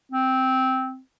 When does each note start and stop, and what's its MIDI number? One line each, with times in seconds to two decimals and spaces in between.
0.12 1.01 60